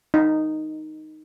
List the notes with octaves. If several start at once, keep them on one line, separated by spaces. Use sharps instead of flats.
D#4